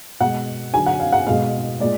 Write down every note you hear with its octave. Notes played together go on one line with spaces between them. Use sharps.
B2 G#3 F#5
D3 F#3 G#5
F#5
F5
F#5
B2 G#3 F5
A#2 G#3 D5